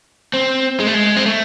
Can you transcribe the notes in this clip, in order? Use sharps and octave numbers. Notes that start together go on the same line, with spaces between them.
C4
G#3
A3
G#3
C4
A3